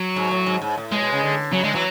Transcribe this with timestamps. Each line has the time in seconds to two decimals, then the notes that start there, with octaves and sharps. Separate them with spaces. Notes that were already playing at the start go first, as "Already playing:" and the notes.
Already playing: F#3
0.16 G#2
0.31 A2
0.46 G#2
0.62 G#2
0.78 A2
0.92 B2 G#3
1.02 B2
1.12 C#3
1.23 D3
1.53 C#3 F#3
1.63 D3 G#3
1.74 E3 F#3